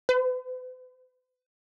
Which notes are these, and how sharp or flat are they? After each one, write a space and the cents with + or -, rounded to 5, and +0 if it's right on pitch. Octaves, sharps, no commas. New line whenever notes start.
B4 +45